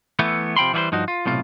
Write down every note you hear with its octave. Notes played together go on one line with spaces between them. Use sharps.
E3 A3 B3
C3 F3 G5 B5 C6
E3 G3 F#4 G#4 B4 C5
G2 F3 D#4 F#4
F4
B1 A2 C3 F4